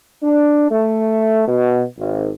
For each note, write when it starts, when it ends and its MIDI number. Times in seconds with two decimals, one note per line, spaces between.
0.22 0.70 62
0.71 1.43 57
1.47 1.81 47
1.98 2.29 32